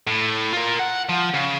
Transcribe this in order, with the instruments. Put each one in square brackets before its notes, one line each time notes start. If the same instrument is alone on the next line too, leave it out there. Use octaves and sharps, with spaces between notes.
[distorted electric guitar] A2
F4 A#4
F#5
F3
C#3